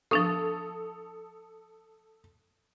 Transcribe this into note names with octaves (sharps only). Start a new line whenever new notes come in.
F3 D4 A4 C#6 D#6